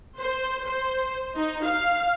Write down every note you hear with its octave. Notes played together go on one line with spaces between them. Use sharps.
C5
C5
D#4
F5